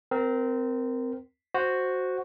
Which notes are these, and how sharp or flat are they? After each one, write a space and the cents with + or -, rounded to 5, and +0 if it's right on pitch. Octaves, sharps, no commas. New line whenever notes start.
C4 -20 A#4 +0
F#4 +0 C5 +0